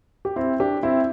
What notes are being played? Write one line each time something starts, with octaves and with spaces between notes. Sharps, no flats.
G4
C4 E4
D4 G4
C4 E4